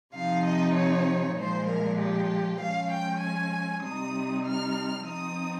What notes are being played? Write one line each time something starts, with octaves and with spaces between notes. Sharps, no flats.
C3 F3 C4 D#4 F5
D#5
C#5
A#2 F3 G#3 C5
A#4
G4
F3 G#3 C#4 F5
G5
G#5
C3 G3 C4 D#4 D#6
F6
F3 C4 D#4 D#6